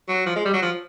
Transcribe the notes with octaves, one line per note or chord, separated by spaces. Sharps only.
F#3
F3
G#3
G3
F#3
F3